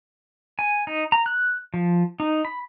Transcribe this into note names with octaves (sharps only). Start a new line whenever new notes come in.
G#5
D#4
A#5
F#6
F3
D#4
B5